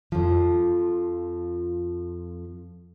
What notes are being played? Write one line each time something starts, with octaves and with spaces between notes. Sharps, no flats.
F2 F3